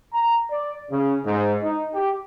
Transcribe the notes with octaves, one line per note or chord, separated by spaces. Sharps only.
A#5
D5
C#3
G#2
D#4
G4